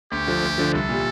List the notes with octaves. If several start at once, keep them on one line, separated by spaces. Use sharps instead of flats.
D2 G4
D3 F3
D2
D3 F3
C2 A4
A#2 G3